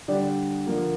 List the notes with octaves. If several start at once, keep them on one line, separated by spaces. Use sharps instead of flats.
D3 G3 D4 G4
D3 F3 A#3